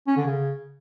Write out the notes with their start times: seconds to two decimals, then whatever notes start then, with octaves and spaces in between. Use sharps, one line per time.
0.07 C#4
0.17 D3
0.26 C#3